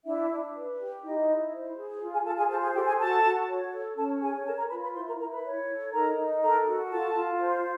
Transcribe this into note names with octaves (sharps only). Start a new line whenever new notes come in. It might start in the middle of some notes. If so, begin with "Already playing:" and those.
D4 E4 E5
D4
B4
G4
D#4 E4 D#5
E4
C5
G#4
F4
G#4 G#5
F4 A4 A5
G#4 G#5
A4 C5 A5
G#4 G#5
G4 A4 G5
G#4 G#5
F#4 A4 A5
F#4
C#5
A4
C#4 A4 A5
G#4 C#5 G#5
A4 A#4 A5
A#4 A#5
F4 B4 B5
B4 B5
E4 C5 C6
A#4 A#5
E4 A#4 A#5
B4 B5
C#5
A4
D#4 A#4 A#5
D#4
A4 A#4 A#5
F#4
F4 A4 A5
F4
C5